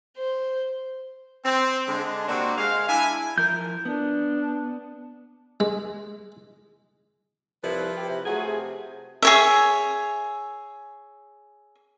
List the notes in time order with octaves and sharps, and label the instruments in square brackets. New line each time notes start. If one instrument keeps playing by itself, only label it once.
[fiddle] C5
[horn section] C4
D3 G#3 D4
C3 A#3 C4 D4 F#4
G#3 F5
D4 E4 G#5
[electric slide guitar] F3 E4 A#4 [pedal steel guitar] G6
[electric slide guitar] B3 [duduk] D4
[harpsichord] G#3
[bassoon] C2 [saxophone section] F3 E4 B4
[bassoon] G4
C3
[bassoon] F#3 [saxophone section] A3 F4 G#4
[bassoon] C3
[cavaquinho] G#4 C#5 E5